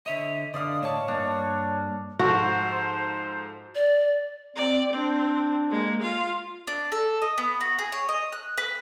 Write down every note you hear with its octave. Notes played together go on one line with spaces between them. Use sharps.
D3 C#5 D#5 E5
D3 D5 D#5 F5 D#6
A2 C#5 A5
G2 A#3 D4
G#2 F3 F#4 A4 C5
D5
C4 D5
C4 D4
G#3 A#3
F4 F5
D4
A4
D#5
B3
F#4
G#4
C#5
D#5
F#6
B4